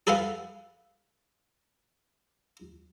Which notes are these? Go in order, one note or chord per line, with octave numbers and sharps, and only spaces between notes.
G#4 A4 B4 F5 F#5